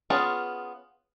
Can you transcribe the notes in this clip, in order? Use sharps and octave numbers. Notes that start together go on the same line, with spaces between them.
B3 C#4 F4 G#4 A5